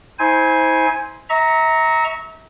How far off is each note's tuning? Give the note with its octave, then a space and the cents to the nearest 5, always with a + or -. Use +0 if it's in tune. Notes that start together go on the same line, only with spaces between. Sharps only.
E4 -40 C5 +0 G#5 +0
E5 -35 A#5 +0 C#6 +0